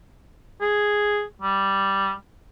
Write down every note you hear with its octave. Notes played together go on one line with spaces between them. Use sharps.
G#4
G3